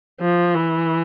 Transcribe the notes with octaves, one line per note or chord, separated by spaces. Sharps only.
F3
E3